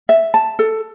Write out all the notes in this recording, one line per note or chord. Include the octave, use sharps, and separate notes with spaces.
E5
A5
A4